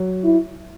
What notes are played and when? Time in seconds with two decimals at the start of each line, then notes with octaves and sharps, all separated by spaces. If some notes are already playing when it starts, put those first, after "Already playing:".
Already playing: F#3
0.24 E4